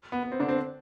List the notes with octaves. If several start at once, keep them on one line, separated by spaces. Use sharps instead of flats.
B3
B3
C4
D3 D4
C4